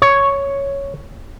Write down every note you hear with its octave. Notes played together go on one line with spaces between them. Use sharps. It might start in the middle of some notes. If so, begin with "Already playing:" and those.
C#5